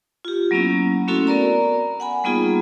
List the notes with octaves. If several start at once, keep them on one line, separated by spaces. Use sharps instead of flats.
F4 G4
F#3 A#3 B3 C#4 E4
A3 C4 C#4 E4 F#4 A4
B3 A#4 D5 A#5
F#5 G#5 B5
G3 A#3 B3 D#4 F4 G#4